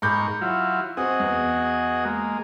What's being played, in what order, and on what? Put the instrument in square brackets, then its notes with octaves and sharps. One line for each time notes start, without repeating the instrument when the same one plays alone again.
[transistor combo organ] G#2 A#4 C#6 [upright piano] B5 D6 G6
[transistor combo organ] F#3 E4 F4
[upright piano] C4 [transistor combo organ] F#4 G#4 D#5
[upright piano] E2
[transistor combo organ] G#3 A#3